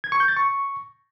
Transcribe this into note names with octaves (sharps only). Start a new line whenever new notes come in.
G#6
C#6
G6
A6
C#6